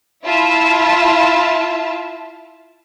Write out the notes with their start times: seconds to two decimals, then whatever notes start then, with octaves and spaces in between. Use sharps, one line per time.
0.24 E4 F4 E5 A5